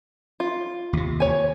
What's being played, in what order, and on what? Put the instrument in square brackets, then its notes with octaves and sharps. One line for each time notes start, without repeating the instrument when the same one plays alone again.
[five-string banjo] F4
[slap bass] D#2 C3
[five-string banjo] C#5 G#5